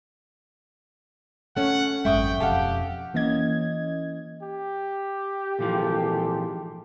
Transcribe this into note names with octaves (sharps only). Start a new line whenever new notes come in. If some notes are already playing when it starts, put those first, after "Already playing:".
A3 C#4 F#5
G#1 F#2 G#3 E5 G5 C#6 D#6
E1 F2 G4 A4 F5 F#5
E3 A#3 C#4 D#5 G#6
G4
G#1 A#2 E3 F3 G#4 A4